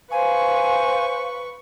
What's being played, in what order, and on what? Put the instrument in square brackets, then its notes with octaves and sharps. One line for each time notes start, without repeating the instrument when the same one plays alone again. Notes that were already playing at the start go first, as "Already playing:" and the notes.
[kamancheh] B4 C#6 [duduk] C5 [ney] F5 [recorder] G#5